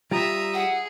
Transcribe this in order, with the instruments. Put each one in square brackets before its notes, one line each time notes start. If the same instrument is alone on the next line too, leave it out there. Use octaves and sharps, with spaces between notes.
[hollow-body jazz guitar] G3 F4 [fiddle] E5 D#6 [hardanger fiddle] A#5
[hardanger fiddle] G#4 [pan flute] F#5